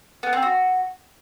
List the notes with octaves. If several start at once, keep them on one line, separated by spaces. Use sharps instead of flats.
B3
C4
F#4